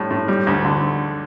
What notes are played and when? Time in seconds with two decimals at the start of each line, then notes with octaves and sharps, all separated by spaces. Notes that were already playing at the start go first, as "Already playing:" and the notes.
Already playing: A2 G3
0.11 A2
0.28 G3
0.47 D2
0.65 D3